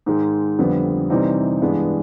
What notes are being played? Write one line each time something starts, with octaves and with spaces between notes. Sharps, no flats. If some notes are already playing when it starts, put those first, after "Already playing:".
G#2 D#3 G#3
F2 D3 G3 B3
C3 E3 G3 C4 D#4
G2 E3 G#3 B3 D4